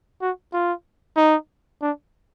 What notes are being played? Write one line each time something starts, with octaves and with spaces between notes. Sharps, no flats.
F#4
F4
D#4
D4